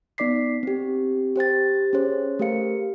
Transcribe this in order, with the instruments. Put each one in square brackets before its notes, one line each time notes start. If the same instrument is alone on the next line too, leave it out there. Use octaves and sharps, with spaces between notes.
[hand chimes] B3 D#4 D5 D6 B6 C7
C4 G4
G4 C5 G5 A6
C#4 G#4 C5 C#5
A3 G4 A#4 F5 C#7